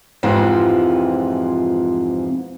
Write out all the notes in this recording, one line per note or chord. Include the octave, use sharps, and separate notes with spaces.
F2 G#2 C3 E3 F3